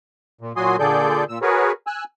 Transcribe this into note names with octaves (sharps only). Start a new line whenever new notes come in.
A#2
A#2 F#3 F#4 G#5 C6 D#6
A#2 D3 G#4 A4 D5 G6
A#2 E6
F#4 G#4 A#4 B4 C#5
G#5 E6 F#6